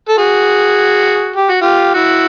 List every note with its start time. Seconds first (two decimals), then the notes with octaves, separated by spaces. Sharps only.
0.09 A4
0.17 F#4 G#4
1.36 G4
1.49 F#4
1.61 F4 G4
1.94 E4 F#4